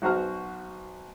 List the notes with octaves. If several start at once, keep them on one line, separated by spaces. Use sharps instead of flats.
B1 F#4 C5 A#5 F6